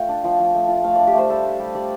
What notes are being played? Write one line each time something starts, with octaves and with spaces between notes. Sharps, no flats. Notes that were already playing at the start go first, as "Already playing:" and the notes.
Already playing: A3 F4 G5
D4
F3
F3
A3
F4
A3 F5
D4 D5
G4
A3 C5
G3 A4
D4
G3
G3 D5